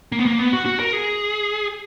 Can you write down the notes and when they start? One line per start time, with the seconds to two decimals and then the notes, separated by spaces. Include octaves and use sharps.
0.12 A#3
0.19 B3
0.26 A#3
0.39 B3
0.53 F#4
0.65 F#4
0.79 A#4
0.93 G#4